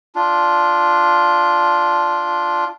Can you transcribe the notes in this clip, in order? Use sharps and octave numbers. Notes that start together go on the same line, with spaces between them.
D4 F4